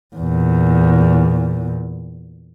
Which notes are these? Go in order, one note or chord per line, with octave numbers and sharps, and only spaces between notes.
E2 A#2